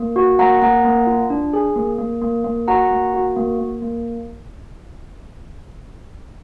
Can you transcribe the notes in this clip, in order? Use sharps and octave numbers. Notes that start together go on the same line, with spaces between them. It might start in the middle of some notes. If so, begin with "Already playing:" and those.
Already playing: A#3
F#4
A#3 F#5 A#5
A#3 F#5 A#5
A#3
F4
D4
G#4
A#3
A#3
A#3
A#3
F#4 F#5 A#5
A#3
F#4
A#3
A#3
A#3